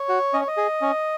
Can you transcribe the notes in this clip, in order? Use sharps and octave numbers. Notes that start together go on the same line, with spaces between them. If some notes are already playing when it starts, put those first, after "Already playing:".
Already playing: C#5
F#4
C#4 D#5
C#5
D#5
G#4
C#4